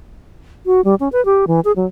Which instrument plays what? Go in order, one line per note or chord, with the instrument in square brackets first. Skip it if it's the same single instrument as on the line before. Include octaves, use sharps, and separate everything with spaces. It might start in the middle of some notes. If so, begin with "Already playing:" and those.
[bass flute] F#4
G3
C#4
B4
G4
E3
G#4
F#3